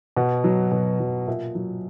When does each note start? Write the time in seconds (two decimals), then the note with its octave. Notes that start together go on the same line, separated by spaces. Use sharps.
0.17 B2 F#5
0.44 F#3
0.72 B2
0.99 F#3
1.27 A#2 E5
1.55 F#3